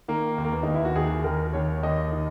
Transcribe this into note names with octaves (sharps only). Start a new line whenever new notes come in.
D#3 A#3
D#2
A#3
B3
D#2 D#4
E4
F#4
D#2 G#4
D#2 A#4
D#2 C#5
D#2 D#5
D#3